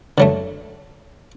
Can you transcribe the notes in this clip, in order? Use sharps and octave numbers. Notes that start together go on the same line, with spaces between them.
D3 F#3 A3